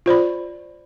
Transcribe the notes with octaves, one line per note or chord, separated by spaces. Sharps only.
F4 C5 D5 B5